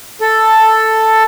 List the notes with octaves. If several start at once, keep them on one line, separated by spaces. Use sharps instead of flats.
A4